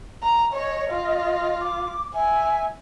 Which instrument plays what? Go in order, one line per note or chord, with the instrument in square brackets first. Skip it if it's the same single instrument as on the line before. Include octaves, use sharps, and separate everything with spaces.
[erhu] A#5
[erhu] C#5 [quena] D#5
[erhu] F4
[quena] D6
[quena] E5 [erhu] G#5